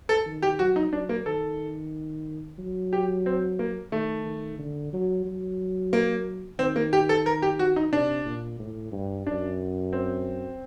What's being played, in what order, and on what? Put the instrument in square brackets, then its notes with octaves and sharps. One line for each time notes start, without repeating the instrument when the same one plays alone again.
[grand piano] A4
[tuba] D#3
[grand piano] G4
[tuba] F#3 [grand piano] F#4
[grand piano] D#4
[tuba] F#3 [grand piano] D4
[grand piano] A#3
[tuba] D#3 [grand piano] A4
[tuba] F#3
[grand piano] G4
C4
A#3
[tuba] D#3 [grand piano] A3
[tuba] D#3
D3
F#3
F#3
[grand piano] A#3
[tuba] D#3 [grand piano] C4
[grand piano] A#3
G4
A4
A#4
G4
F#4
D#4
[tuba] C3 [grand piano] D4
[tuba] A#2
A2
G2
[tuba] F#2 [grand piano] D4
[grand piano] C4